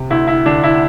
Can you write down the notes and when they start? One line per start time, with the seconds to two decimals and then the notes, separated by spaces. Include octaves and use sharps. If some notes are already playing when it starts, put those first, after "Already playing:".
Already playing: C3
0.10 D2 E4
0.28 E4
0.46 D3 D4
0.64 E4